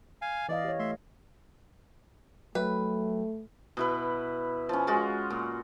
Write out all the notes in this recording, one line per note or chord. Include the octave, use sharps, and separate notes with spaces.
F5 G#5
E3 D5 D#5 F5
G4 C#5
A3 E5 C6
F#3 A3 B4 E5 G5
B2 E4 B4
F3 C#4
G#3 F4 F#4
A#2